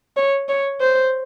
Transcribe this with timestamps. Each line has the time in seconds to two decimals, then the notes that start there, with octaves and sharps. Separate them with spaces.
0.17 C#5
0.49 C#5
0.81 C5